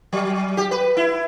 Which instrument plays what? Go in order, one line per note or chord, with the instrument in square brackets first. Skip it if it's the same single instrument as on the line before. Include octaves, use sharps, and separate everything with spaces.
[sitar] F#3
G4
B4
E4